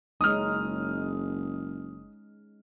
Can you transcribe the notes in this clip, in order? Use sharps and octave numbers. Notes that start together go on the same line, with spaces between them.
F#1 G#3 C#4 D#4 D#6 F6